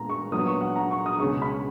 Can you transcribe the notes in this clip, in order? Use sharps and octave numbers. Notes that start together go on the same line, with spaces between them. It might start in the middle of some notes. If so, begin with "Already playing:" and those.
Already playing: A#2 G#3 B3 A#5
C#6
A#2 F#3 B3 D#6
C#6
F#5
A#5
C#6
D#6
C#2 B2 G#3 C#4 C#6
B5